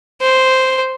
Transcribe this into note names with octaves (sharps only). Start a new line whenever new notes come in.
C5